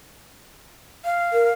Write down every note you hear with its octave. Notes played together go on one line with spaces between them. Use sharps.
F5
A#4